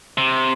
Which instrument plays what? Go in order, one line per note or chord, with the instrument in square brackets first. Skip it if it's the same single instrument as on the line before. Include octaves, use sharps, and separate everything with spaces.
[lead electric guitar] C3